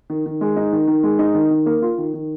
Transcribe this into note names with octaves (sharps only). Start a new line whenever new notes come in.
D#3
D#3
G#3
D#4
D#3
D#3
G#3
D#4
D#3
D#3
A#3
F4
D#3
D#3